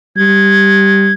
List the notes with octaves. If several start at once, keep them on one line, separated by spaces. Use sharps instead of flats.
G3 G#6